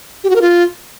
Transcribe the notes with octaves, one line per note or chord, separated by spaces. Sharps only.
G4
F#4
A#4
F4